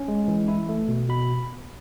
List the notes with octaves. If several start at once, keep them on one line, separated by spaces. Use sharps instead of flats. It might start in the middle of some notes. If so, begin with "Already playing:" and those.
Already playing: C#4
G#3
E3
E4
A3
B2
B2 B5